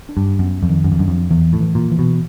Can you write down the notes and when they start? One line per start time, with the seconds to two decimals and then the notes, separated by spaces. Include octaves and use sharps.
0.09 D4
0.17 G2
0.39 F#2 B3
0.63 F2
0.69 D#3
0.84 F#2
0.92 F2
0.99 F#2 D4
1.08 F2
1.30 E2 E3
1.53 A2
1.60 E3
1.75 A#2
1.92 E3
1.99 B2